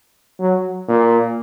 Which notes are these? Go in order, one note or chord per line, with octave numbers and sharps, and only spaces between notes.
F#3
A#2